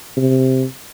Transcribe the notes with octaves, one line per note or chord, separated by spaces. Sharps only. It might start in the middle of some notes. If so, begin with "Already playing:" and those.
C3